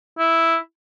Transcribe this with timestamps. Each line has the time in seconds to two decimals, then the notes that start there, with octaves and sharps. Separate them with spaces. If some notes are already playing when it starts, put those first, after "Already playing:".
0.19 E4